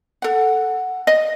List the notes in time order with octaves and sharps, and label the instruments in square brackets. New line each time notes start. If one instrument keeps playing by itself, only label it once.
[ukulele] A4 F#5
D#5